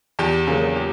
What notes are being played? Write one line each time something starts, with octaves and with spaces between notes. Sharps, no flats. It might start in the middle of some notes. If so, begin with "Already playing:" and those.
E2 G4
C#3 F#3 A#3 G#4
G4